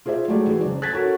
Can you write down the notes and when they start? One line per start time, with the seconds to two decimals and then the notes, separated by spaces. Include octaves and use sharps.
0.06 F4 G#4 C5 D5 E5
0.28 F#3 G#3 A3 G4 G#4 D5
0.47 E3 G#3 E4 F#4 G#4
0.61 F#1 D5
0.82 F#6 G#6 A6 B6
0.93 C#4 F#4 A4 A#4